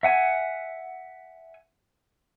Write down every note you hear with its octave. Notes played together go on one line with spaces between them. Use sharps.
E5 F#5 G#5